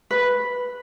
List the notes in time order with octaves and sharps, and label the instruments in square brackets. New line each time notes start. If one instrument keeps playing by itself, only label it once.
[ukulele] B4